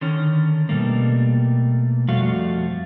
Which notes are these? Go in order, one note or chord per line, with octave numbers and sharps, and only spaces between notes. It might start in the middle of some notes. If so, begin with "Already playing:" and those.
D3 D#3 C#4
B2 G3 A3 A#3
F2 G3 A3 F#4 F5